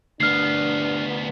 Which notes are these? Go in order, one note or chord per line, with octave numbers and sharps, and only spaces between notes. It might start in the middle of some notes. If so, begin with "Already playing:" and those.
D2 B3 D4 F6 C7